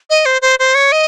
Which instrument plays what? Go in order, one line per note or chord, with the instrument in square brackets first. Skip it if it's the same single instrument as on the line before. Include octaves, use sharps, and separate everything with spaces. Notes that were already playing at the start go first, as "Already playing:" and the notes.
[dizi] D#5
C5
C5
C5
C#5
D#5